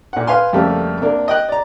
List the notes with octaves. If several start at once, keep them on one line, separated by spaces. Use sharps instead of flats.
A#2 F#5
B4 F5 G#5 C6
F2 C#3 G3 A3 A#3
C3 A#3 D4
D#5 G5 F#6
D5 A#5